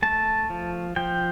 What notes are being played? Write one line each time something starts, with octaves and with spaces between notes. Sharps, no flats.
A3 A5
F3
F3 G5